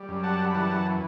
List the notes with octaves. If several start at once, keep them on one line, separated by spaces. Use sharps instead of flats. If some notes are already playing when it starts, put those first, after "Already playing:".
Already playing: G3
F#2
F#5 A5
B5
E3 F#5 A5